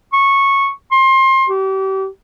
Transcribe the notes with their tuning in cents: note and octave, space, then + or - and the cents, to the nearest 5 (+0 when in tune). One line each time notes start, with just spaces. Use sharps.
C#6 -10
C6 +30
G4 -35